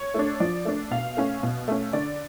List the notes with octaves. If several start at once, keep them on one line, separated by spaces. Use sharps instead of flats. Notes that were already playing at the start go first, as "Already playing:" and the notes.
Already playing: C#5
A3 D4
F3 D5
A3 D4
B2 F5
A3 C#4
B2
A3 C#4
D3 D5